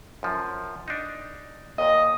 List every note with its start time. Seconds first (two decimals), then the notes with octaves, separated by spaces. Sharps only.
0.23 F#2 F3
0.88 D4 D#4
1.78 D#2 A#2 D#5